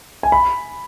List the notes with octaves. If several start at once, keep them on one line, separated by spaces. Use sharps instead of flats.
G#5
B5